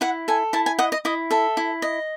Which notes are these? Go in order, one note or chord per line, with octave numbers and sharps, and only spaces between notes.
E4 F#5
A4 G#5
E4 A5
G#5
D#5 F#5
D#5
E4 D#5
A4 E5
E4
D#5